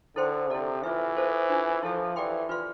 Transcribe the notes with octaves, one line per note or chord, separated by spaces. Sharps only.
D3 E4 A4 C5 G5 C6
C3 E4 A4 D5
E3 F4 B4 E5
A4 C5 F5 A5
D4 F4 C5 E5
F3 E4 A4 E5
E3 G4 D5 G5 C6
F4 B4 D5 F5 C6